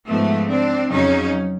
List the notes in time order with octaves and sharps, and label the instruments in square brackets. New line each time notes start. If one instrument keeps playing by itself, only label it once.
[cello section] G#2 F3 A3 B3
C4 D4
F2 C#3 F#3 C#4 D#4